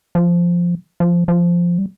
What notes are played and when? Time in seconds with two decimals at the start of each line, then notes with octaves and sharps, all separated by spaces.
0.15 F3
1.00 F3
1.28 F3
1.78 G3